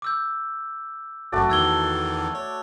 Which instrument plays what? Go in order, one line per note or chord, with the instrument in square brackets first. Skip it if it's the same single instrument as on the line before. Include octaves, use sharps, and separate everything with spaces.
[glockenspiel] D6 E6 G6
[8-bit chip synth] G1 F#2 [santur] A3 F#4 D5
[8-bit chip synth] E2 D#3 E3 [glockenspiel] E6 G#6 G7
[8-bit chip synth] C#5